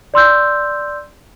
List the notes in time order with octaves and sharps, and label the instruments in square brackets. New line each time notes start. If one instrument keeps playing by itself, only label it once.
[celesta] D5 C6 E6 G6